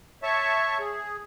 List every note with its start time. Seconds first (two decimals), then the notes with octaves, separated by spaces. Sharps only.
0.23 C#5 E5 A5 C#6
0.79 G#4